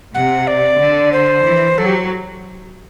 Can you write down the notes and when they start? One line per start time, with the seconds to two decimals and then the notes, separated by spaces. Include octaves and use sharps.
0.14 C3 F#5
0.47 D5
0.79 D3
1.12 C5
1.46 E3
1.78 F#3 A4
1.86 G4